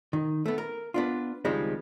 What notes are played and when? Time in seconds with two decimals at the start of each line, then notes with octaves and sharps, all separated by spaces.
0.13 D#3
0.46 A3 B3
0.58 A#4
0.94 B3 D4 F4
1.45 C#2 D#3 F3 G3 G#3 C4